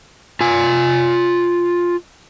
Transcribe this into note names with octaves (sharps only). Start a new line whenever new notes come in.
F4 G#5